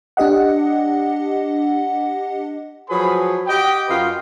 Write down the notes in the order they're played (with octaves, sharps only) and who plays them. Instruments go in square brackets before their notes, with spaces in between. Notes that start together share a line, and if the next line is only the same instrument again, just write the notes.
[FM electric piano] D4 G4 D#5 F#5
[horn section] F3 F#3 G#4 B4 B5
G4 D#5 F#5 G5
F#2 F4 F#4 B4 D#5 G5